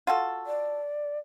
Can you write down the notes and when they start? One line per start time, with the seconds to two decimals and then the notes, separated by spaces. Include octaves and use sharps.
0.07 F4 F#4 A4
0.46 D5